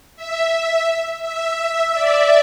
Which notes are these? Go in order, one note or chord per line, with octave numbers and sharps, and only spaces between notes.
E5
E5
D5